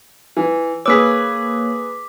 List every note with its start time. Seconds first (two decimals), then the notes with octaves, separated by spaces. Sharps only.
0.37 E3
0.86 A#3 G#4 B4 C#5 D6 E6 B6